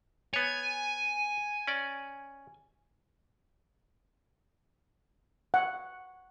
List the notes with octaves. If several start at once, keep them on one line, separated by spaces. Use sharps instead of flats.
B3 C#5 G#5
C#4 D5
F#5